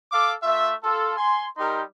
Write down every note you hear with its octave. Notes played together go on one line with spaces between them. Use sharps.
A4 F5 D6
A3 F4 E5
F4 A4
G#5 C6
G3 D#4 G4 A#4 C6